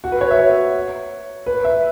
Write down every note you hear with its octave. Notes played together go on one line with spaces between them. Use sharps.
F#4
B4
C#5
E5
C#5
B4
E5